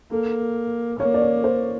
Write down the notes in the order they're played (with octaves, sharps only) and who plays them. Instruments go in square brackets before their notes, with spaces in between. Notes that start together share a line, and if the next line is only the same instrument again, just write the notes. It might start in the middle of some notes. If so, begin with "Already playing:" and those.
[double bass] A#3 [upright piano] A4
[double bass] A#3 [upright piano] C#5
[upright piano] D5
C#5
C5